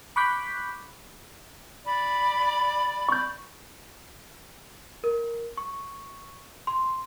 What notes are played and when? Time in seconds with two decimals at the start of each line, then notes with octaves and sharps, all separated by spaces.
0.16 B5 C#6 D6 F#6 G6 B6
1.85 D5 B5
3.09 C#6 G6
5.04 A#4
5.57 C#6
6.67 C6